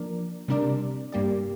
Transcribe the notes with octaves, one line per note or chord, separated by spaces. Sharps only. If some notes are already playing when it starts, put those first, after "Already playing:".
Already playing: F3 A#3 D4 A#4 D5
C3 G3 D4 A#4 D5
G2 G3 A#3 G4 D5